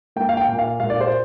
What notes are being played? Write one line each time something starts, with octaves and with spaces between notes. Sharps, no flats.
A#3 G5
F5
G5
A#2
F5
A#2 F5
D5
C5